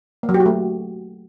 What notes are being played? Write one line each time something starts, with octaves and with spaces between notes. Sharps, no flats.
A#3
F#3
G4
F#4
A3